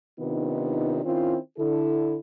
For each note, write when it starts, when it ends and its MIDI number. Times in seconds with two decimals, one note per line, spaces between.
0.20 1.00 48
0.20 1.00 51
0.20 1.00 59
0.20 1.00 62
0.20 1.00 63
0.20 1.00 65
1.04 1.37 51
1.04 1.37 60
1.04 1.37 61
1.04 1.37 64
1.04 1.37 65
1.58 2.17 50
1.58 2.17 64
1.58 2.17 69